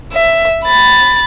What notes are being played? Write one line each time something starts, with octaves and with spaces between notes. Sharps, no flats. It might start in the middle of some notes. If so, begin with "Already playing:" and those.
E5
B5 A6